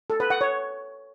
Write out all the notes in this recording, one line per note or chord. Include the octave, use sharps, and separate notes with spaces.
A4
B4
F#5
C#5